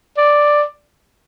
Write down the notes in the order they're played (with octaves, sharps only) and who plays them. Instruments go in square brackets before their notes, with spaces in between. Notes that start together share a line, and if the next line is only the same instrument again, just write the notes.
[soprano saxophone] D5